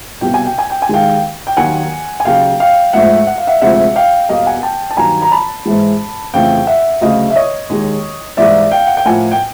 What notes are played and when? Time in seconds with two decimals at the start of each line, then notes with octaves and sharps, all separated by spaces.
0.21 C2 B2 G3 A#3 G5
0.34 G#5
0.45 G5
0.58 G#5
0.70 G5
0.82 G#5
0.89 D#2 D#3 G#3 F5 G5
1.47 G5
1.57 D#2 D#3 F#3 A#3 F#5 G#5
2.20 G#5
2.25 D#2 C#3 F#3 A#3 F5 G5
2.60 F5 G5
2.93 G#2 F3 A3 E5 F#5
3.27 F#5
3.38 F5
3.47 E5 F#5
3.61 D2 C3 F3 G#3 E5 F#5
3.96 F5 G5
4.29 E2 B2 G3 A#3 D#5 F5
4.46 F#5 G#5
4.63 G5 A5
4.91 A5
4.97 G2 D#3 F#3 A#3 G#5 A#5
5.22 A#5
5.31 A5 B5
5.65 G#2 E3 G#3
6.33 F2 C#3 E3 A3 F5 G5
6.67 E5 F#5
7.01 D2 C#3 F#3 A3 D#5 F5
7.30 E5
7.36 C#5 D#5
7.69 D#2 D#3 G#3
8.37 G#2 E3 G3 A#3 D5 E5
8.71 F5 G5
8.87 F#5
8.97 G5
9.05 A2 F3 A#3 F#5 G#5
9.32 G5